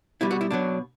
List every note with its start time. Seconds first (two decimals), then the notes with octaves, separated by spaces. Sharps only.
0.21 B2 G3 E4
0.31 F#4
0.41 E4
0.51 B2 F#3 D4